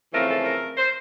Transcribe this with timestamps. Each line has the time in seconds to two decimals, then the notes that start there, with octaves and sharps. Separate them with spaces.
0.12 F2 C#3 E3 A3 C4 A#4
0.28 A4
0.44 A#4
0.77 C5